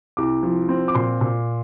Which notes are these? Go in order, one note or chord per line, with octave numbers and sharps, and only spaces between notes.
C2 D6
F3
C4
D6
A#2 C6
A#2